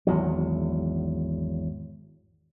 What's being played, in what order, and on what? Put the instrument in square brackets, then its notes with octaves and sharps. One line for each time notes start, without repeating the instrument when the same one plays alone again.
[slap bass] G#1 E2 F#3